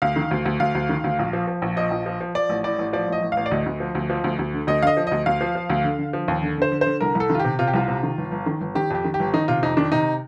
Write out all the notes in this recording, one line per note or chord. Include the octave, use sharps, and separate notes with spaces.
D2 F5
D#3
D2
D2
D2 F5
D2
D#3
D2
A#1
F3
F3
A#1
F3 D#5
A#1
F3
F3
F3 D5
A1
A2 D5
A1
F3 D5
A1 D#5
A1
A1 F5
D5
D2 D#5
D2
F3
D2
F3
D2
D2
D3
D2 D#5
D3 D#5 F5
F3
D2 D#5
D2 F5
F3
F3
D2
D3
D3
F3
D#2
D3
D3 C5
D3
C5
D3
C2 A#4
C2
A4
D#3
F4
C3 G4
C3 F4
G4
C2 F4
C3
D#3
G1
G1
D#3
G1
D#3 G4
F2 G4
D#3
G4
G1
D#3 D#4
C3 F4
F2 D#4
D#3 D4
C3 D#4